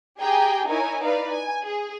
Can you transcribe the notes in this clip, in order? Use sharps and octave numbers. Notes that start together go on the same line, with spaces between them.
G4 G#4 G5 G#5 A#5
D#4 E4 A#4 C#5 G#5
D#4 B4 D5 F5
G#5
G#4